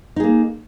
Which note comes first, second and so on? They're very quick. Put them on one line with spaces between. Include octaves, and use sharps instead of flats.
D#4 G#4 A#3